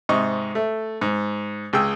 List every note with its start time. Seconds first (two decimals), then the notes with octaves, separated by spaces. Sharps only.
0.09 G#2 C3 D#5 C#6
0.55 A3
1.01 G#2
1.73 C#2 G#4 G5 E6